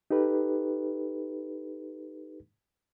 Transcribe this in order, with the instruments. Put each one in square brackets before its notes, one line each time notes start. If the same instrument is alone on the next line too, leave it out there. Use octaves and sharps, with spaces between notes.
[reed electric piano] D#4 G4 A4 B4